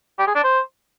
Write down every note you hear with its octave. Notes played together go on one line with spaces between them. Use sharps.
G4
G#4
D4
C5